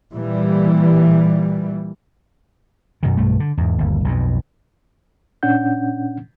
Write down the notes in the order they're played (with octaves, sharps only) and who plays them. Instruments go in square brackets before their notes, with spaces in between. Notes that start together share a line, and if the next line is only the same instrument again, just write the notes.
[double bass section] A#2 E3 G3
[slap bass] F#2 B2 D#3
B1 G2 A3
D3
E2 G#2
G1 D#2
B1 F2 B2
[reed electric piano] A#2 C#4 D4 F#5 G6